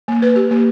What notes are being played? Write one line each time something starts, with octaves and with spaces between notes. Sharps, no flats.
A#3
B4
G4
A#3